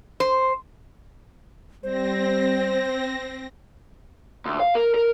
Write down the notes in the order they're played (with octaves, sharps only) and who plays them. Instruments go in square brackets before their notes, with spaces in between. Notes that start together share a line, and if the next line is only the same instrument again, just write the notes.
[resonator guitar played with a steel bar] C5
[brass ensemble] G3 [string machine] C4 A#6 [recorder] C5
[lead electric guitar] D2
F5
A#4
A#4